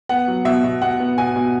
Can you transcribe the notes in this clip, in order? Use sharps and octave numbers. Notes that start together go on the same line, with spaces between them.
B3 F#5
F#3
B2 E5
B2
B2 F#5
B3
B2 G#5
B2